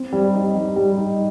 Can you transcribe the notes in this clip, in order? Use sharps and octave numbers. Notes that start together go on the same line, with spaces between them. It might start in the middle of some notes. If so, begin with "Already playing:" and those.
Already playing: C4
G3
D#4
G3
G3
D#4